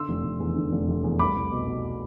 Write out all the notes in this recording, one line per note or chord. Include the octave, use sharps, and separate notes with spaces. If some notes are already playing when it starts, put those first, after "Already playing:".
Already playing: D3 C6 E6
F1
F1
E2
D3
F1
F1
E2
C2 B5 D6
C2
B2
B2